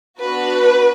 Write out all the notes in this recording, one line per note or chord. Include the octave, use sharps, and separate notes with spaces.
B3 D4 F#4 B4